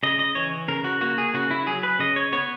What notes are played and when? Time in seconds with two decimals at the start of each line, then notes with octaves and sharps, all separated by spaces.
0.03 C#3 D#5
0.19 D#5
0.35 E3 C#5
0.68 C#3 A#4
0.84 F#4
1.01 A#3 F#4
1.18 G#4
1.34 C#3 F#4
1.51 E4
1.66 F#3 G#4
1.83 B4
1.99 C#3 D#5
2.16 C#5
2.33 B3 C#5